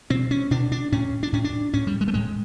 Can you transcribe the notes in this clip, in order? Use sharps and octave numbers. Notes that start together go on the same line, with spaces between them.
B2 C4
C#4
B2 D4
D4
A2 C#4
D4
A2 C#4
D4
A2 C#4
G3
G#3
A3
A2 G#3